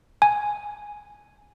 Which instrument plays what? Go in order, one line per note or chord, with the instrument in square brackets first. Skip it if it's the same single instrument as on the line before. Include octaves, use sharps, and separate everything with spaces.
[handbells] G#5